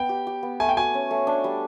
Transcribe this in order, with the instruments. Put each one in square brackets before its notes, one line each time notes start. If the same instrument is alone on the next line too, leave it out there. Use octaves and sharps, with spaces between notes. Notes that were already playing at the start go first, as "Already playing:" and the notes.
Already playing: [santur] B3 [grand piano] G5
[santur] G4
G4
B3
[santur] A3 [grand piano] G#5
[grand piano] G5
[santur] F#4 [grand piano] G#5
[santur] C#4
A3
D4
G3